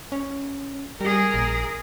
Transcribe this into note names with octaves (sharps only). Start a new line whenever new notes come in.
C#4
G3 G#4 A#4
A#1